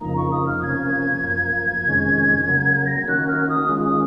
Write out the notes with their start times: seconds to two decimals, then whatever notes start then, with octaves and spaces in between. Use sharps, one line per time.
0.01 F2 C#3 F3 A#3 D#4 A#5
0.17 C#6
0.31 D#6
0.46 F6
0.62 C3 F3 A#3 C#4 G#6
1.24 F#2 F3 A#3
1.85 F2 C3 D#3 G#3 C#4
2.46 C#3 F#3 A#3
2.86 A#6
2.97 G#6
3.08 D#3 A#3 C#4 F#4 F#6
3.27 F6
3.49 D#6
3.69 D#3 G#3 C#4 F4
3.84 D#6